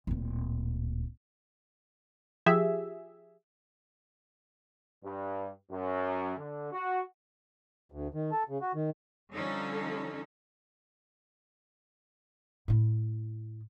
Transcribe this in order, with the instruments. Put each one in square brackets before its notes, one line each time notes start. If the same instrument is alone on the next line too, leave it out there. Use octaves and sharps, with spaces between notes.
[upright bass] D1 A#2
[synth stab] F3 G4 G#4 E5
[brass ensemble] G2
F#2
D3
F#4
[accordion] D2
D#3
A4
C#3
F#4
D#3
[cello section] D3 F3 G3 C#4 D#4 A4
[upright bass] A2 E4